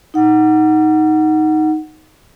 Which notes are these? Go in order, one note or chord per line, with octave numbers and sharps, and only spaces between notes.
D#4 F#5